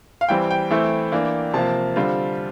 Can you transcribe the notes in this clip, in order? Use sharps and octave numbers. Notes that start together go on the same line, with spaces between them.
F5
E3 G3 C4 G5
G5
E3 A3 C4 E4
E3 A#3 D4
C3 F3 A#3 A5
D3 G3 C4 F4